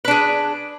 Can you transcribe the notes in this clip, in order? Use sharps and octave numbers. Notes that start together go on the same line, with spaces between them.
D4 G#4 B4